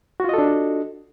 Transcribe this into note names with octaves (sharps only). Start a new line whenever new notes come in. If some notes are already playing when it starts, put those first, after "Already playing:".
D4 F4 F#4 A4 D#5